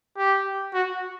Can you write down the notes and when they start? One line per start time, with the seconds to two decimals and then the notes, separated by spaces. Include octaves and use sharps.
0.17 G4
0.74 F#4